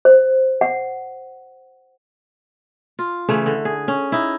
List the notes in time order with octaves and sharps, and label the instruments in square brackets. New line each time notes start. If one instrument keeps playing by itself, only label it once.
[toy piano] C5
F#5
[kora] F4
C#3 E3 A3
D3
G#4
C#4
D#4 E4